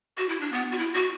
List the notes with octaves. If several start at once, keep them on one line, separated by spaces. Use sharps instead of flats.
F#4
E4
D4
B3
F#4
E4
F#4